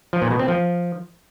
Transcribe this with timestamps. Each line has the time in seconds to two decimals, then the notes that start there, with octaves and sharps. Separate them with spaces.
0.13 F3
0.22 A#2
0.31 B2
0.39 C4
0.48 F3